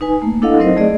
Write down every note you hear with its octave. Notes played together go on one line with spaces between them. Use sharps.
D#4 B4 G#5
A3 A#3
D4 E4 A4 D#5 F5 F#5
F#3 C4 D#4 A#4 C5 D#5
A3 G#4 D5 D#5